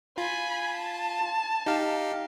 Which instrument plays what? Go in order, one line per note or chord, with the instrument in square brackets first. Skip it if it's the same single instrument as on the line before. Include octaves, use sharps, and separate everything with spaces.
[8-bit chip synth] F4 [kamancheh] G#5 B5
[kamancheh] A5
[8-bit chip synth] D#4 G4 F5